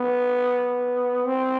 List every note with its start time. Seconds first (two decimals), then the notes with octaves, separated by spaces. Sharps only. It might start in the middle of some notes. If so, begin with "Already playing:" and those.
Already playing: B3
1.26 C4